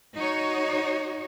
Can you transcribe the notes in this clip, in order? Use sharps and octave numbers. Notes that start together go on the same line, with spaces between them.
D#4 F#4 C#5